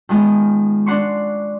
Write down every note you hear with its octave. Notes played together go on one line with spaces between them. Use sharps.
D#3 F3 G#3 B3
D4 F#5 C6 C#6